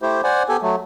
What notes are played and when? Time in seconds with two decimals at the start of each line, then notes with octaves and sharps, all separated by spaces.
0.02 A3 E4 G4 C5
0.24 C5 D5 F#5 G#5
0.49 B3 G4 A4 G#5
0.62 F#3 A3